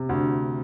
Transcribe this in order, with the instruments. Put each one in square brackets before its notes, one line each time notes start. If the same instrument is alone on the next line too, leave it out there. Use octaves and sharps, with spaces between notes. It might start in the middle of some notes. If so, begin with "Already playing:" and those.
Already playing: [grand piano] C3
D2